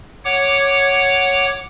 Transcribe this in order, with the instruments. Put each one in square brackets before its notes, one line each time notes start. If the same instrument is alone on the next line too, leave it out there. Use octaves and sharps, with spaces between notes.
[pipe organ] C#5 F#5 D6